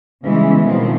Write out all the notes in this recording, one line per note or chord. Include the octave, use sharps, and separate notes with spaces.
C#3 E3 G3 G#3 B3 C#4
B2 D#3 F3 B3 C4